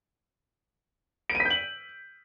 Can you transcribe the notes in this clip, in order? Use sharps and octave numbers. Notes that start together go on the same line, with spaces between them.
D7
D#7
B6
G6
F#7